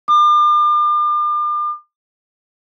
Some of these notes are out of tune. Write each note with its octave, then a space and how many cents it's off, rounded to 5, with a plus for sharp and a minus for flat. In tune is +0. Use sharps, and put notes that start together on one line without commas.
D6 +40